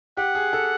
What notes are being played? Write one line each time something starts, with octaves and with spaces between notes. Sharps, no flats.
G4 F#5
G#4
A4